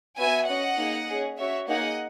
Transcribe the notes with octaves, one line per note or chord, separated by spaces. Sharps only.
B3 F#4 E5 G#5
C#4 F#4 D#5 F#5
A#3 D#4 G#4
C#4 G#4
C#4 F#4 C#5 E5
A#3 D#4 G#4 D#5 F#5